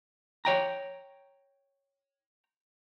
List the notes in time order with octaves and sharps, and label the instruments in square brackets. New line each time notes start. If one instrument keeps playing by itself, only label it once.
[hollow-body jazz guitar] C#5 G5 A#5